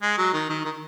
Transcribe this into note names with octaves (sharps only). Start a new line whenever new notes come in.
G#3
F#3
D#3
D#3
D#3